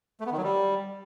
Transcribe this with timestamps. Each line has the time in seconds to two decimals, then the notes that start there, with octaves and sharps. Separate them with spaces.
0.20 A3
0.26 B3
0.32 D#3
0.37 F#3
0.43 G3